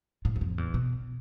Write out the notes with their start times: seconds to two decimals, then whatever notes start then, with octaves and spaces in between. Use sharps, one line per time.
0.25 A2
0.36 E2
0.41 F2
0.58 E2
0.74 B2